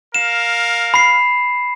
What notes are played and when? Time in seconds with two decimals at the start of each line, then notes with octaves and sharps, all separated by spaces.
0.15 A#4 F5 E7
0.94 B5 C7